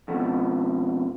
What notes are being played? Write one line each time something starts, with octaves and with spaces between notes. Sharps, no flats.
F2 B2